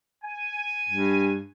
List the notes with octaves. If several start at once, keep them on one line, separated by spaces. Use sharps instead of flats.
G#5
G2